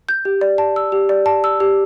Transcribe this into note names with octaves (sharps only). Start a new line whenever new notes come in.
G6
G4
D5
A5
E6
G4
D5
A5
E6
G4